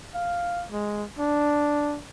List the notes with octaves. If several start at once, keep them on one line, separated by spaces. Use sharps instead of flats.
F5
G#3
D4